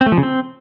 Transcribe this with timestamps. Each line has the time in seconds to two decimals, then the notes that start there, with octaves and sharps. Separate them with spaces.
0.01 C4
0.06 A3
0.12 F3
0.18 C#3
0.23 C4